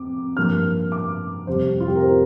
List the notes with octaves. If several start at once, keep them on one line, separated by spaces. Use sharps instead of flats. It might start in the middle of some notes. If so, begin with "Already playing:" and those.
Already playing: F2 C4 D6
G2 F3 A#3 F6
D6
F1 F2 C3 G3 C5
F4
G4
A#4
C5